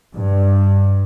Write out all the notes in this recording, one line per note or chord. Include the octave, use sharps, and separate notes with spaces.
G2